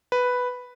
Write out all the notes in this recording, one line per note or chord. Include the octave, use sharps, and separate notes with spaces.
B4